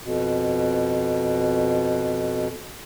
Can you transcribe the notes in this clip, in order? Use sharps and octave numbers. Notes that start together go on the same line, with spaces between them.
F2 B2